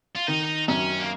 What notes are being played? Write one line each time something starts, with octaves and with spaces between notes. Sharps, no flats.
F4
D#3 D#4
F#2 C#4
A#3